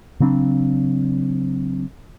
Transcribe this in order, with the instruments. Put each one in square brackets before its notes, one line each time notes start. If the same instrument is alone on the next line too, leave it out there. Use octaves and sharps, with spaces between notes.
[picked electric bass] C#3 F#3 C4 D4